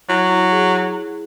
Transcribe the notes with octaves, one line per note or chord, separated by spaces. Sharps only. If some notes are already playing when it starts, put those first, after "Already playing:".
F#3 E4
E4
G#4